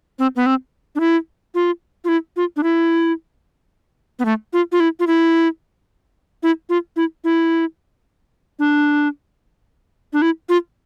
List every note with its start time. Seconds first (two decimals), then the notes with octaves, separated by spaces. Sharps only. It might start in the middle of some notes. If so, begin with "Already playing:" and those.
0.19 C4
0.36 B3
0.46 C4
0.95 D4
1.00 E4
1.55 F4
2.04 F4
2.09 E4
2.36 F4
2.56 D4
2.63 E4
4.19 B3
4.25 A3
4.53 F4
4.72 F4
4.80 E4
5.00 F4
5.07 E4
6.43 E4
6.69 F4
6.96 E4
7.24 E4
8.59 D4
10.13 D4
10.22 E4
10.49 F4